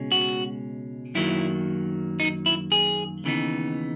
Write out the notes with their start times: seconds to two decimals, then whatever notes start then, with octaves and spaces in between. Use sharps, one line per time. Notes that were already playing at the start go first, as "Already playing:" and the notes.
Already playing: C#2 B2 G#3 C#4
0.12 F#4
1.15 F#2 D#3 F#3 A#3 E4
2.20 D#4
2.46 E4
2.72 G#4
3.24 D#2 C#3 E3 B3 D#4